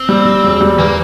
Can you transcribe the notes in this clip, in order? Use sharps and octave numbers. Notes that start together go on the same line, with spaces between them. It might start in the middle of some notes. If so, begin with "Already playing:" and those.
Already playing: C4
G3
G3
E1
G3
E2 A#3